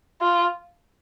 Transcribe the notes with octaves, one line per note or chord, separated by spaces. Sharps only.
F4